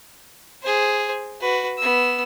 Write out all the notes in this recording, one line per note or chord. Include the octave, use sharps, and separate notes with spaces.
G#4 C5
F#4 B4
B3 E6